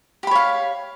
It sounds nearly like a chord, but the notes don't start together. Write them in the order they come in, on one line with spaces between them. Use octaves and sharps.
G4 B5 C#5 F5